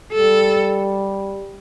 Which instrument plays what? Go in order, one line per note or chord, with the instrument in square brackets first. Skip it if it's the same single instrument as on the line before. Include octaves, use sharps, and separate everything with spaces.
[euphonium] G3 [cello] A4